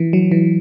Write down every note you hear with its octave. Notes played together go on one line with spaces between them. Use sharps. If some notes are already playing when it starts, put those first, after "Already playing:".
Already playing: E3
F#3
E3